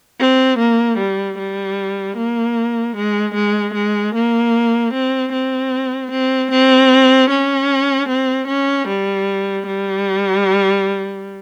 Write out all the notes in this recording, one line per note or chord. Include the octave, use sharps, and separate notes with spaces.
C4
A#3
G3
G3
A#3
G#3
G#3
G#3
A#3
C4
C4
C4
C4
C#4
C4
C#4
G3
G3